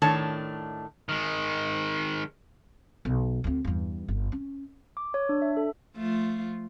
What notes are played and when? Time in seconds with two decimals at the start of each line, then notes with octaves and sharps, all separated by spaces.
0.02 A2 D#3 A3 D4 C#5 A5
1.09 D#3 G#3
3.05 B1
3.44 D2 C4
3.65 E2 G2
4.09 G1
4.32 C#4
4.97 D6
5.14 C#5
5.29 D4
5.42 E5
5.57 A4
5.96 F3 A3 F4